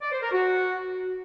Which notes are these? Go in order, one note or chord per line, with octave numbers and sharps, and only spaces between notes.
D5
C5
A#4
F#4